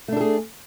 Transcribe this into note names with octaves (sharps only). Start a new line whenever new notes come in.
A3 D4 G#4 A4